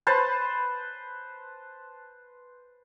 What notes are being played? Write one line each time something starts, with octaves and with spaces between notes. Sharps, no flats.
B4 C5 A5